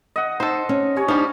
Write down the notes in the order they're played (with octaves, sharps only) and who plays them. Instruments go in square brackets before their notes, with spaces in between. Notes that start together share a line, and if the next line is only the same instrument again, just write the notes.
[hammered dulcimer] D#5 F#5
[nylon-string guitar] D#4 [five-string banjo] A4 C5
[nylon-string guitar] C#4
[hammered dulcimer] C#4 C#5 [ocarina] G4
[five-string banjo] F3 G3 [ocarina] D4 [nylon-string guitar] D#4